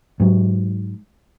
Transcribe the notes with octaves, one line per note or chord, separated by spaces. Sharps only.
G#2 F#3